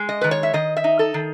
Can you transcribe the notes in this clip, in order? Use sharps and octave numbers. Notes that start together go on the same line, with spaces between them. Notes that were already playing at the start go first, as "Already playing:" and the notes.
Already playing: G#3
D#5
D#3 B4
C#5
E5
D#3 D#5
E5
D#4
A4
D#3